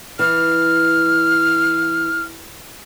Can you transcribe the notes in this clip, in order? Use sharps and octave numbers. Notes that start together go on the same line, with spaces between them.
E3 F6